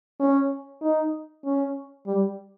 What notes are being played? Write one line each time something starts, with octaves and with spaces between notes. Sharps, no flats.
C#4
D#4
C#4
G3